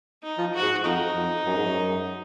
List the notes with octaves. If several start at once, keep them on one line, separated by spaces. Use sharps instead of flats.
D#4
F3
F#4
G#2
F2 D#4
F2
F#2
G#2
F#2